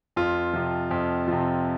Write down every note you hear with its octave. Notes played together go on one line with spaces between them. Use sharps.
F2 F4
C3 F3
F2
C3 F3